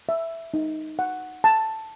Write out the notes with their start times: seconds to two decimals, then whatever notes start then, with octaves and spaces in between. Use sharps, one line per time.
0.09 E5
0.54 D#4
0.99 F#5
1.44 A5